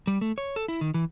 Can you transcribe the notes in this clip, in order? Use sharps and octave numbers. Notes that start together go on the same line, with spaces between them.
G3
A3
C#5
A4
E4
D#3
E3